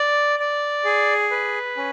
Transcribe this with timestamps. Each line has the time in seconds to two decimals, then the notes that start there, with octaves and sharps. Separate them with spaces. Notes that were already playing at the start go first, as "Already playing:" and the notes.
Already playing: D5
0.40 D5
0.85 G#4
1.31 B4
1.77 C#4